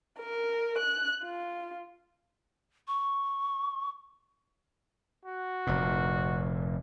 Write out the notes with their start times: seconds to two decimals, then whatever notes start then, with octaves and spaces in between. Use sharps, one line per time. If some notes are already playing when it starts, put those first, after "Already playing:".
0.19 A#4
0.78 F#6
1.24 F4
2.88 C#6
5.25 F#4
5.67 F1 A#2